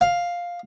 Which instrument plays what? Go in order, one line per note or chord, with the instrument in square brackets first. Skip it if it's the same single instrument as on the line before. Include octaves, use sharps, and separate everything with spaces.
[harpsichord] F5